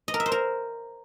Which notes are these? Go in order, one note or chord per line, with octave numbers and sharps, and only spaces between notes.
D#5
A#4
E5
C5
A#4